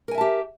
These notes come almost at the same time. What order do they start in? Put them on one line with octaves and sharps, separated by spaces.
A#4 G#5 E5 A5 G4